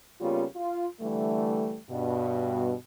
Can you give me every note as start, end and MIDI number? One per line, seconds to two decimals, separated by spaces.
0.20 0.43 49
0.20 0.43 55
0.20 0.43 58
0.20 0.43 59
0.20 0.43 61
0.20 0.43 65
0.56 0.86 65
1.00 1.77 50
1.00 1.77 52
1.00 1.77 55
1.00 1.77 57
1.89 2.73 43
1.89 2.73 47